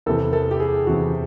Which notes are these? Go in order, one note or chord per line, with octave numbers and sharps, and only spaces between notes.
E2 C3 E3 A4
A4
G4
G#4
E2 C3 E3 F#4